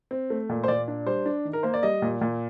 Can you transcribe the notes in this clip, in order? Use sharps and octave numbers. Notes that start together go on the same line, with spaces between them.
C4
A3
A#2
C5
A#2 D5
D4
G3 C5
D4
D#3
A#4
A#3 C5
D5
G3 D#5
A#2
A#2